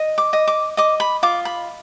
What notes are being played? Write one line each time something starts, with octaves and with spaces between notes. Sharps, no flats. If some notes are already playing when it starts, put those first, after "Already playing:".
Already playing: D#5
D6
D#5
D6
D#5 D6
B5
F4 D6
B5